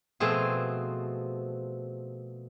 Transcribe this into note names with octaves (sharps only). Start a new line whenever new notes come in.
B2 F3 A3 C4 G#4